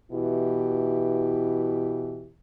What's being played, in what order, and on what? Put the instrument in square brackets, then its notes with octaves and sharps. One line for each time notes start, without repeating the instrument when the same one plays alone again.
[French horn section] B2 E3 E4 G4